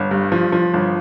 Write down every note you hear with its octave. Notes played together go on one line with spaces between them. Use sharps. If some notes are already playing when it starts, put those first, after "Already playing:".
Already playing: G1
G2
F3
F3
G1